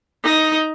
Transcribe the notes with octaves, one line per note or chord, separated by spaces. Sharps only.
D#4